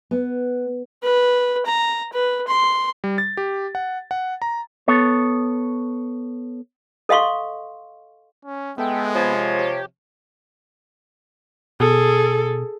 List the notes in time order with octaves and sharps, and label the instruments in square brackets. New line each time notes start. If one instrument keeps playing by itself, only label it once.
[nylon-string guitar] B3
[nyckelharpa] B4
A#5
B4
C6
[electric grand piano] G3
A6
G4
F#5
F#5
A#5
[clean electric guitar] B3 A4 C#5
[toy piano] A4 D#5 F5 C6 C#6
[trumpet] C#4
[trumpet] G#3 [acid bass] B3 [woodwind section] A4 E5 G5
[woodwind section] C3 C#5 [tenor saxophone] F3
[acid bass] G4
[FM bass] B2 [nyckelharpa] G#4 [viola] A4